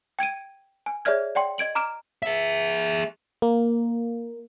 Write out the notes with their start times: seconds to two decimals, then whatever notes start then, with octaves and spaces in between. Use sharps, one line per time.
0.19 G5 G#6 D7 D#7
0.86 G#5
1.05 G#4 C#5 D5 E5 F6 G#6
1.35 D5 F#5 G5 C6
1.58 D#5 G#6 D7 F#7
1.75 A#5 D6 F6 D7 E7
2.23 G#4 E5
3.42 A#3